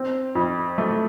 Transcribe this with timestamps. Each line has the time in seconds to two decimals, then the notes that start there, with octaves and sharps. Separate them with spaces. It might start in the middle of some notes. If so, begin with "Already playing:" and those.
Already playing: C4
0.35 F2
0.78 A3